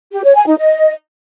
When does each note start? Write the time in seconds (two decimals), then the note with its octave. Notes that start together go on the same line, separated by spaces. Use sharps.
0.12 G4
0.24 C#5
0.35 G#5
0.47 D#4
0.58 D#5